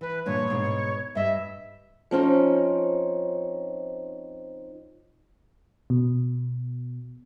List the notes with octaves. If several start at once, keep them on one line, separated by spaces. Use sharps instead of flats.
E3 B4
G2 A#2 E3 C#5
G#2 B2
G2 D#5 E5
F3 C4 C#4 D#4
B2